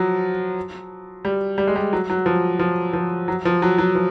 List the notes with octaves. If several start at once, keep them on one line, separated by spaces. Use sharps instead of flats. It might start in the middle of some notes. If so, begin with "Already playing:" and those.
Already playing: F3 F#3
G3
G3
G#3
G3
F#3
F#3
F3
F3
F3
F#3
F3
F#3
F#3
F3